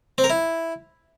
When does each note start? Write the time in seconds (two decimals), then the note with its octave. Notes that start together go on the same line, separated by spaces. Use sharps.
0.18 C4
0.24 A#4
0.30 E4